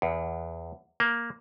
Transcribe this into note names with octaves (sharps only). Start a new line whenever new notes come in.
E2
A#3